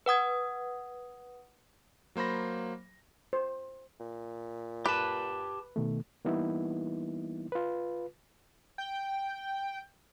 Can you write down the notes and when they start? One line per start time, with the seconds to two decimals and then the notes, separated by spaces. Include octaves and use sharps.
0.06 B4 F#5 D#6 G#6
2.16 F#3 A#3 C5 B5 A#6
3.33 C5
4.00 A#2
4.86 G4 B4 A5
5.76 B2 D#3 A3
6.25 E3 G3 A#3 B3 D#4 E4
7.52 F4 B4
8.78 G5